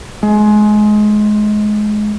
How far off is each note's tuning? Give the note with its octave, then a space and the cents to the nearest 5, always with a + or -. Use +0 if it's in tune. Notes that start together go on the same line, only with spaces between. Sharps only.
G#3 +25